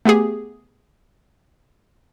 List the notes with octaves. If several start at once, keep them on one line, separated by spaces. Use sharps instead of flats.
A3 B3 G4 G#4